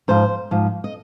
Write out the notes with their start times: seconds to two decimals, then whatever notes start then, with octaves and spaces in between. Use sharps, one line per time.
0.08 G#2 F3 C5
0.51 G#2 F3
0.84 D#5